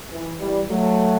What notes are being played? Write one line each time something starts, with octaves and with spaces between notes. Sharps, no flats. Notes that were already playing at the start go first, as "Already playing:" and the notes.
E3
E3 G3
F#3 A3